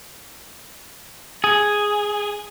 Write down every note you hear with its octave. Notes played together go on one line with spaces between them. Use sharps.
G#4